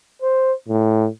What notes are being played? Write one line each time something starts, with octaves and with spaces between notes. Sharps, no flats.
C5
A2